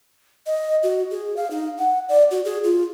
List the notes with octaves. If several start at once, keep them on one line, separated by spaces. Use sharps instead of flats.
D#5
F#4
G#4
F5
D#4
F#5
D5
F#4
G#4
F4